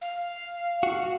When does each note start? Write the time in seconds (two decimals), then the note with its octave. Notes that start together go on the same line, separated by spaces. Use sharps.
0.02 F5
0.83 F#4